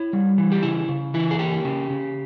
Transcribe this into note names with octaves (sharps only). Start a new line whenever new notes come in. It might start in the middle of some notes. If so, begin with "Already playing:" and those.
Already playing: E4 C#5
G3
E3
G4
C#3 E4
C#3
E3 E4
G#4
A#3 G4
C#3
C#3